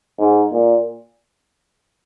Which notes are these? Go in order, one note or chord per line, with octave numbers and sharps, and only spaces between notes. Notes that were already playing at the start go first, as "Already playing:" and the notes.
G#2
A#2